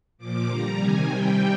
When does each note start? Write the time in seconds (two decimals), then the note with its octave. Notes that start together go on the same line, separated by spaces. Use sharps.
0.18 A#2 F3 D6
0.47 D3 G3 A#5
0.77 C3 D#3 G3 G#5
1.06 C3 G3 G5